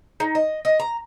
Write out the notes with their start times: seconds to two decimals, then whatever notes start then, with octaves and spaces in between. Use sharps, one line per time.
0.20 D#4
0.35 D#5
0.65 D#5
0.80 A#5